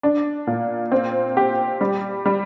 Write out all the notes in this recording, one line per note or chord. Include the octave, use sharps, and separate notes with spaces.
D4
A#2
C4
G4
G3
G3